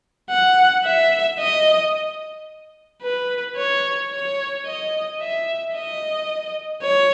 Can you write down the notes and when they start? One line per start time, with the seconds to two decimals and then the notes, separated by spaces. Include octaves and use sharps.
0.30 F#5
0.85 E5
1.40 D#5
3.02 B4
3.57 C#5
4.12 C#5
4.66 D#5
5.20 E5
5.75 D#5
6.83 C#5